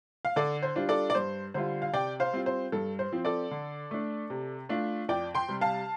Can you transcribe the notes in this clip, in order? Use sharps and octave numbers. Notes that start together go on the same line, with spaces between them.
F5
D3 A4 D5
C5
G3 D4 F4
A4 D5
D5
G2 C5
D3 G3 F4 C5
F5
C3 D5 G5
C5 F5
G3 C4 F4
C5
G2 A4
C5
F3 C4
A4 D5
D3
A3 D4
C3
A3 D4 F4
F2 D5 G5
G5 C6
C3 G3
F5 A5